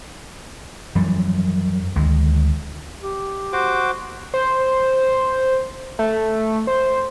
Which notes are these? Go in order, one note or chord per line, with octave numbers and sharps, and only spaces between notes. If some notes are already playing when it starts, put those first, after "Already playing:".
F#2 E3 F3 G3
D2 D#3 G#3
G4
F#4 C5 D6
C5
A3
C5